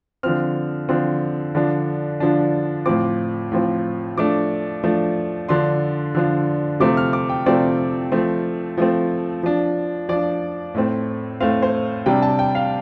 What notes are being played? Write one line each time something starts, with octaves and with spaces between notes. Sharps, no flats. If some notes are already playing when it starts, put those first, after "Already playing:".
D3 F3 C4 F6
D3 F3 C4
D3 F3 D4
D3 F3 D4
A2 F3 C4 D6
A2 F3 C4
F3 A3 D4 D6
F3 A3 D4
D3 F3 D4 C6
D3 F3 D4
C3 F3 A3 C4 D6
F6
D6
G5
C3 F3 A3 C4 D5
F3 A3 C4
F3 A3 C4
F3 D4
F3 D4 D5
A2 A3 C4
A2 A3 C4 F5
C5
C3 G3 D4 G5
A5
G5
F5